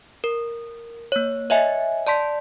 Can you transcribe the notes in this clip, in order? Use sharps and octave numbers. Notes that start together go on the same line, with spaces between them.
A#4
A#3 C#5
C#5 D#5 E5 G#5
D5 A5 C6 B6